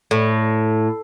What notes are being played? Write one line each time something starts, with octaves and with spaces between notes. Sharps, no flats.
A2